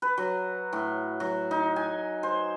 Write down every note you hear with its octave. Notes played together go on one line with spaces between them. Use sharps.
B4
F#3
A2
F#3
D#4
G#5
C5